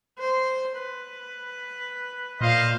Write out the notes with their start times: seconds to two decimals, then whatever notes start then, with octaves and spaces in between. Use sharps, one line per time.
0.19 C5
0.77 B4
2.41 A#2 C5 D#5 F5